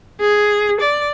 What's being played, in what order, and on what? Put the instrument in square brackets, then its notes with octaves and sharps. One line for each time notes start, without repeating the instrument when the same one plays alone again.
[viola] G#4
D5